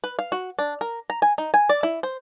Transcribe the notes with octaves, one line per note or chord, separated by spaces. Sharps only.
B4
F5
F#4
D4
A#4
A#5
G#5
D#4
G#5
D5
E4
C5